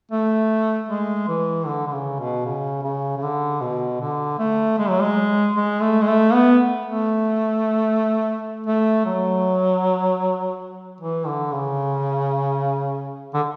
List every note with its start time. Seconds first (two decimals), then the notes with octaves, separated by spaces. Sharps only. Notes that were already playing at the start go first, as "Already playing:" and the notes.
0.11 A3
0.88 G#3
1.28 E3
1.66 D3
1.87 D3
1.92 C#3
2.19 B2
2.45 C#3
2.83 C#3
3.17 C#3
3.23 D3
3.61 B2
4.00 D3
4.39 A3
4.78 G#3
4.89 F#3
5.02 G#3
5.56 G#3
5.81 A3
6.01 G#3
6.08 A3
6.33 B3
6.86 A3
8.67 A3
9.05 F#3
11.00 E3
11.26 D3
11.52 C#3
13.34 D3